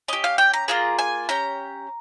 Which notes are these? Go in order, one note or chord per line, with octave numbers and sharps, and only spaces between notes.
C#4 G4 D#5
F5
G5
A#5
A#3 F4 G#4 A#5
G#5
C#4 G4 A#5